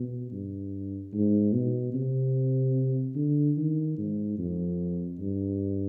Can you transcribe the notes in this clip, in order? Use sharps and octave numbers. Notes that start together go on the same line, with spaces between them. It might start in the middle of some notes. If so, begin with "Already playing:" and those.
Already playing: B2
G2
G#2
B2
C3
D3
D#3
G#2
F2
G2